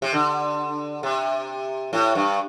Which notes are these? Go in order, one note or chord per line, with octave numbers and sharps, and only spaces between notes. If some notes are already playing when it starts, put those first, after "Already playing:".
C3
D3
C3
A2
G2